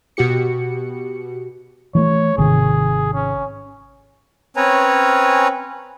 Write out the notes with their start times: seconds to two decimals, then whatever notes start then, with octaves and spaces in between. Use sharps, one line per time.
0.17 B2 F#4 G4 C#7
1.95 E3 G#3 A3 C#5
2.38 G#1 C3 D#3 G#4
3.13 C#4
4.56 C4 C#4 B4 C#5 G#5 A#5